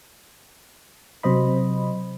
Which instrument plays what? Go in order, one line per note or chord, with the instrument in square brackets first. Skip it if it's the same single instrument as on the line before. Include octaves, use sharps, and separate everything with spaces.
[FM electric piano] C3 F#3 C5 D#5 B5